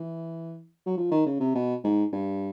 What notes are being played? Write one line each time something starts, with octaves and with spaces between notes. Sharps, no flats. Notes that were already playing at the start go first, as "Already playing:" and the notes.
Already playing: E3
F#3
F3
D#3
C#3
C3
B2
G#2
G2